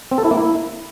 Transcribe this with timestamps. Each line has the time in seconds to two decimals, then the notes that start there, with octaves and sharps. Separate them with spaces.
0.11 C4
0.18 A4
0.24 E4
0.31 A#3
0.37 E4